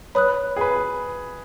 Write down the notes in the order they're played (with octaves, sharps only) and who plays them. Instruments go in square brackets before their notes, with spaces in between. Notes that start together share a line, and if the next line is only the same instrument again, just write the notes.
[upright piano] B4 [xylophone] C#5 B5 D#6 F#6
[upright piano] G#4
B4